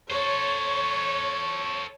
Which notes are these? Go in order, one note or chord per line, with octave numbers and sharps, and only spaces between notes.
A4 C5 C#5 C#6